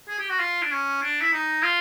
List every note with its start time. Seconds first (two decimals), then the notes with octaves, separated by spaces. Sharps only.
0.09 G#4
0.19 G4
0.29 F#4
0.40 F4
0.62 D4
0.71 C#4
1.02 D4
1.21 E4
1.33 D#4
1.63 F4